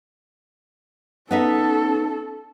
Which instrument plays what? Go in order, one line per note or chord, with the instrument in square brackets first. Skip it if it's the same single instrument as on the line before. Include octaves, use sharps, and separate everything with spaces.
[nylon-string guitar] B3 D#4 E5 [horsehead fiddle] C#4 A4